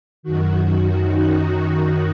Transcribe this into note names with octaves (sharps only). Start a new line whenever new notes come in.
F#2 D#3 F#4
D#4